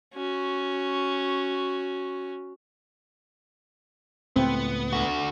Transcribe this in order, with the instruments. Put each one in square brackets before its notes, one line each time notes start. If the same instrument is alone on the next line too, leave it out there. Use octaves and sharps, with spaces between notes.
[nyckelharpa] C#4 F#4
[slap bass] C#2 A2 A3 [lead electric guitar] B3 [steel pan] C4
[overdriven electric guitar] D3 F#4